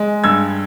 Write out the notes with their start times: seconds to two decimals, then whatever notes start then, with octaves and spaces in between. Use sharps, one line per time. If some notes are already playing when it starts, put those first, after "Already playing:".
Already playing: G#3
0.24 G2 E6 G#6